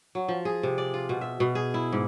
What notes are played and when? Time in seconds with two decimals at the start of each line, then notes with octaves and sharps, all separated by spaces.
0.15 F#3
0.28 F3
0.45 G#4
0.63 C3
0.78 D5
0.94 F4
1.09 B2
1.21 E5
1.40 B2
1.55 G#4
1.74 E4
1.93 G#2